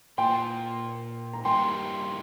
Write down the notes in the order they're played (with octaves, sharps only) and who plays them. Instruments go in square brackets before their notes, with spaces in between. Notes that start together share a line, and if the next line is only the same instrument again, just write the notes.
[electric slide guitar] A#2 A#3 F4 [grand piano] G5 C6
[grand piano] A#5
[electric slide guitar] G2 G3 A#3 D#4 G4 [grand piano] G5 C6